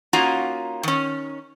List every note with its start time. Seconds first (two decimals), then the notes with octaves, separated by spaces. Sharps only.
0.13 A#3 C#4 D#4 F4 F#4 A#5
0.83 D#3 C#4